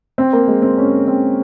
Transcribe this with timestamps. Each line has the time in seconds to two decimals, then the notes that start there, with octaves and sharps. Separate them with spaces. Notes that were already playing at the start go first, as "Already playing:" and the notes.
0.18 C4
0.33 A#3
0.48 G#3
0.62 C4
0.78 C#4
1.07 C4